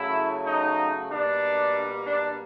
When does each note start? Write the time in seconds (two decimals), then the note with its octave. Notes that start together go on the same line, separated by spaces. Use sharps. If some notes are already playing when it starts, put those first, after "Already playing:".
Already playing: C#3 F#3 A3 E4
0.46 D#4
1.10 B2 G3 A#3 D4
2.07 D4